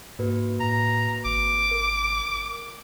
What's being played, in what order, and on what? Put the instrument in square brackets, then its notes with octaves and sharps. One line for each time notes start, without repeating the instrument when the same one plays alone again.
[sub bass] G#2 [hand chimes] A#3 F#4 B4
[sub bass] A2 [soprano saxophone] A#5
[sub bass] G#1 [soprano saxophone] D6
[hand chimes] A#4